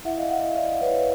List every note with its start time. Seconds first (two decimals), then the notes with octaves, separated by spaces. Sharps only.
0.05 E4 E5 F#5
0.18 D#5 F5
0.30 E4 E5 F#5
0.43 D#5 F5
0.56 E4 D5 E5
0.81 E4 B4 C#5